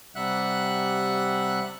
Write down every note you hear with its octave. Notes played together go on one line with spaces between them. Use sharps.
C3 G3 E5 F#5 F#6